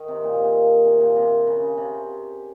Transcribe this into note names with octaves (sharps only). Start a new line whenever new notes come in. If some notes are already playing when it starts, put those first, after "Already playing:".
Already playing: D#3
C3
A#2
C3
A#2
C3
A#2
C3
C#3
C3